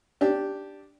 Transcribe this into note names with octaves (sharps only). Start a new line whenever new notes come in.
D4 G4